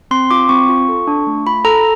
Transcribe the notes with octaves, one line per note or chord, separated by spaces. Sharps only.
C4 C6
F4 D6
C4 C#6
F4
A4
D4
A3
F4 B5
A4 A#5